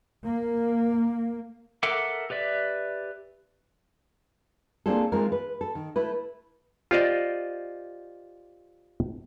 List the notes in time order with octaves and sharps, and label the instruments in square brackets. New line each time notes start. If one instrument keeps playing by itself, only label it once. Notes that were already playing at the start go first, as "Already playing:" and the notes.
[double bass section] A#3
[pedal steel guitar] A4 A#4 E5 F#5 D6
G4 B4 D5 E5
[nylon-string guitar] A#3 C4 D4 F4 G#4 A4
E3 G#3 C4 D#4 F4 A#4
B4
A4
D#3
A3 E4 B4
[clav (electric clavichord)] F4 G4 C5 D5 D#5